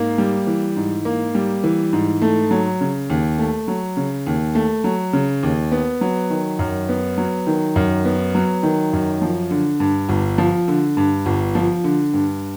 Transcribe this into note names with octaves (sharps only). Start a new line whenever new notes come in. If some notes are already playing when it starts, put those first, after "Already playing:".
Already playing: G#2 A#3
G3
E3
G#2
A#3
G3
E3
G#2
A3
F#3
C#3
D#2
A3
F#3
C#3
D#2
A3
F#3
C#3
D#2
B3
F#3
D#3
F#2
B3
F#3
D#3
F#2
B3
F#3
D#3
F#2
F3
D3
G2
G1
F3
D3
G2
G1
F3
D3
G2